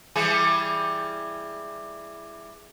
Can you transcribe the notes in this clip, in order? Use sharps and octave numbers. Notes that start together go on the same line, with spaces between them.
E3 G3 G#4